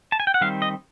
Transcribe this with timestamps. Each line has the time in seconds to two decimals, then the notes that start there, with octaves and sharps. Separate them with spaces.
0.12 A5
0.20 G#5
0.27 G5
0.34 F#5
0.41 D#3 G3 C4 F5
0.62 D#5